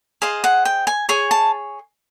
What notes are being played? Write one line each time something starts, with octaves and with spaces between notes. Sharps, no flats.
G#4 C5 D#5 F5
F#5
G5
G#5
G#4 C#5 G#5
A5